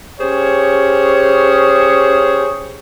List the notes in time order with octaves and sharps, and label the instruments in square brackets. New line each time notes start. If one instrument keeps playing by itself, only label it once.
[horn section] C#4 G4 G#4 C5 C#5